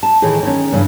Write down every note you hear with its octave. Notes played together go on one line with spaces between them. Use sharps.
A5
A2 D#3 E3 G#4
D#3 C#4
G2 C#3 E3